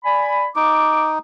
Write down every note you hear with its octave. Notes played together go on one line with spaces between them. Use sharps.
D5 G#5 B5
D#4 D6